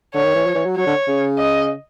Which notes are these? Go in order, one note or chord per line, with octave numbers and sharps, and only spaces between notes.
D3 C#5
D#3
E3
F3
E3
F#3
F#3 C#5
D3
C#3
D#5